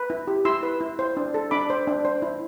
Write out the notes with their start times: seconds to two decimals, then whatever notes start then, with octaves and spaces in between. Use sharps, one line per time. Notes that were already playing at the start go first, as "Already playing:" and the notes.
Already playing: B4
0.10 E4
0.28 G4
0.45 E4 C6 E6
0.63 B4
0.81 E4
0.99 C5
1.17 D4
1.34 A4
1.51 D4 B5 D6
1.70 C5
1.87 D4
2.05 C5
2.22 E4